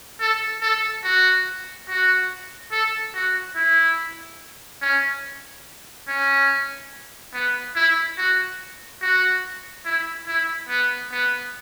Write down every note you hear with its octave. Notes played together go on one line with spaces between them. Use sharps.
A4
A4
F#4
F#4
A4
F#4
E4
C#4
C#4
B3
E4
F#4
F#4
E4
E4
B3
B3